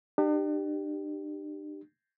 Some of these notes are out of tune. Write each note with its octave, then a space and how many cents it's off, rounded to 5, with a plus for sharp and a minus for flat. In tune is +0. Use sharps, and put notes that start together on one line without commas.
D4 +45 G4 +0